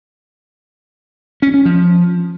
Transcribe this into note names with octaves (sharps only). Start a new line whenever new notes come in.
C#4
C#4
F3